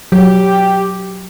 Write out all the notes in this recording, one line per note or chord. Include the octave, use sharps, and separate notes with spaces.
F#3 G4